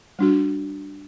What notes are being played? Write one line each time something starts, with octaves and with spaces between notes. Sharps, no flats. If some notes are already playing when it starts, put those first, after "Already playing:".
G3 D4 F#4